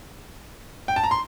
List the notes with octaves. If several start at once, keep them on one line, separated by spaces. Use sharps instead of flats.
G5
A5
A#5
C6